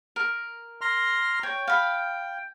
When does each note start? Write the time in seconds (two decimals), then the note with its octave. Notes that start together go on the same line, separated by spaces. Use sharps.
0.16 A#4
0.81 A#5 C6 F6
1.43 C#5 G5
1.68 F5 B5